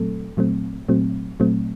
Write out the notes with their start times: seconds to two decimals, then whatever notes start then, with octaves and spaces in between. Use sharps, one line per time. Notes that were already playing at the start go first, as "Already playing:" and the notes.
Already playing: A#2 F#3 A3 C4 A4
0.37 A#2 F#3 A3 C4
0.89 A#2 F#3 A3 C4
1.40 A#2 F#3 A3 C4